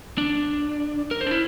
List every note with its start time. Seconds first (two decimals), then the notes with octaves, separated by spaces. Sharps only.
0.18 D4
1.11 A#4
1.21 C5
1.27 D4
1.31 E4